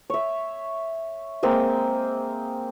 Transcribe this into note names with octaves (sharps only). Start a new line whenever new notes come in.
C#5 E5
G#3 A#3 C4